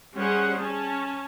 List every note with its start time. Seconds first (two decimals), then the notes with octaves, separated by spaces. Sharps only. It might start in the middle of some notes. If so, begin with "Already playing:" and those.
0.16 G3 C#4 G#4 C5 F#5
0.61 C#4 A5